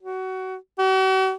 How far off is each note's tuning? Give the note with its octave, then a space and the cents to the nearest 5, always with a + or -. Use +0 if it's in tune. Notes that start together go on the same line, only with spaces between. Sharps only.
F#4 +20
F#4 +45